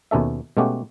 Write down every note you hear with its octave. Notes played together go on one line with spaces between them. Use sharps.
D#2 B2 C#4 A4 E5
B2 G#3 A3 C#4 F#4 G4